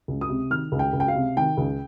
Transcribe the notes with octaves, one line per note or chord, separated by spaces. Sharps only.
C#2
D#6
C3
D#3 F6
C#2
G5
C#2
G5
F5
C3
D#3 G5
C#2